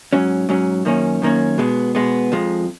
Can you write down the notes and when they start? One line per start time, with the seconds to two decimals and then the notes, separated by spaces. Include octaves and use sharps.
0.13 G#2 F#3 C#4
0.49 G#2 F#3 C#4
0.85 F#2 D#3 A#3 C#4
1.22 F#2 D#3 A#3 C#4
1.58 B2 G#3 B3
1.95 B2 G#3 B3
2.32 F2 F3 G#3